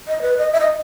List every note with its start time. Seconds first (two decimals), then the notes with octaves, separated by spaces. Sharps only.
0.08 D#5
0.22 B4
0.37 D#5
0.53 E5
0.60 D#5